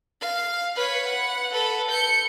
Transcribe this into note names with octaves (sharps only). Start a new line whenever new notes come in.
F5
B4 C#5
F#5
A4 B4
G6 C#7